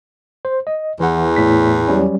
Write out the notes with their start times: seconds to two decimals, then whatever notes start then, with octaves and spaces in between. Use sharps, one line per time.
0.45 C5
0.67 D#5
1.00 E2 E3 F#5
1.36 A2 B6
1.88 F#3 G3 C#4